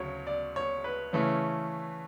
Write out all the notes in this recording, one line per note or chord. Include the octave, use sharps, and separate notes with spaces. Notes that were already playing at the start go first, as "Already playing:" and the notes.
Already playing: D2 C#3 F#3 C#5
D5
C#5
B4
C#3 E3 A3 C#4